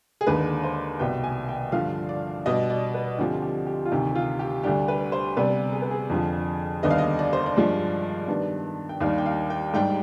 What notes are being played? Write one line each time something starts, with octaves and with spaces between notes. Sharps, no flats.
G#4
D#2 D3 G#3 B4
C5
C2 B2 B3 G5
G#5
G5
G2 D3 F3 F5
D5
B2 G3 D4 D#5
D5
B4
D2 D3 F3 C4 G4
G4
G4
F4
D2 C3 D#3 G4
F4
G4
D2 D3 G3 G4
B4
C5
C3 G3 B3 D4 B4
G#4
B4
G#4
F2 D3 F3
D#2 D3 G3 B3 D#5
F5
D#5
D5
C5
D5
G2 F3 G#3 D4
G2 D#3 B3 D4
G5
D#2 D#3 G3 D4 F5
G5
F5
G5
G#2 G3 D4 G5